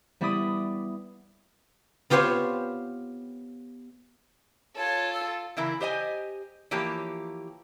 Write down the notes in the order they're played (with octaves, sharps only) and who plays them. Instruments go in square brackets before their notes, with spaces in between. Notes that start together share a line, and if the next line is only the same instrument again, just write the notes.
[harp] G3 B3 E4 D5 B5 D#6
[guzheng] B3 F4 G4 C5 C#5
[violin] F4 A4 [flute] C#5
[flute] E6
[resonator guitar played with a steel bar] C#3 E3 E4 A#4
G4 C5 D#5 G#5
E3 F3 A#3 G4 C#5